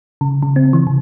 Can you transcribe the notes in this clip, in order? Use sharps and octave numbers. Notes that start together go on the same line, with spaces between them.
C#3
C#3
C4
E3
C3